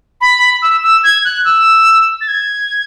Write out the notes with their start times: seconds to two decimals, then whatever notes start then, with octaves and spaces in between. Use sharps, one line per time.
0.21 B5
0.62 E6
0.83 E6
1.03 G#6
1.25 F#6
1.45 E6
2.21 A6
2.28 G#6